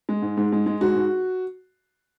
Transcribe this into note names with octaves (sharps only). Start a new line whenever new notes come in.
G#3
G#2
G#2
G#3
G#3
G#2 F#4
G#2